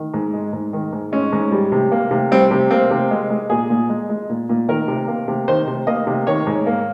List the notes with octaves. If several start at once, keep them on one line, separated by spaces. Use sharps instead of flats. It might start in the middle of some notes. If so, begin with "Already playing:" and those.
Already playing: D#3
G#2
G#3
G#2
D#3
G#2
G#3 C#4
G#2
G3
C3
A#3
C3
G3 C4
C3
A#3 C4
C3
G#3
G#3
A#2 G#4
A#2
G#3
G#3
A#2
A#2
D#3 A#4
C3
A#3
C3
D#3 C5
C3
A#3 D#5
C3
D#3 C#5
G#2
A#3